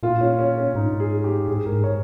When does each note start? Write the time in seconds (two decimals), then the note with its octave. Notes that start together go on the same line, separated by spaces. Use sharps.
0.03 A#2 F4
0.21 C#4
0.39 C#4
0.58 C#4
0.75 G#2 D#4
1.00 G#4
1.24 G4
1.47 G#2 G#4
1.66 A#4
1.72 G#2
1.84 C#5